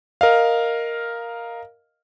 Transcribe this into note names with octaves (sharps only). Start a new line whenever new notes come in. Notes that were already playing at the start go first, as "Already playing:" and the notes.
A#4 D#5 F5